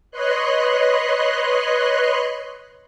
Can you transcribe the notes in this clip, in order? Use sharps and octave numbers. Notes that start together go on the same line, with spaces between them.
B4 C#5 D#5 C6 F#6